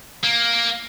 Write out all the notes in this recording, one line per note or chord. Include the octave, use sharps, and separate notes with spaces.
A#3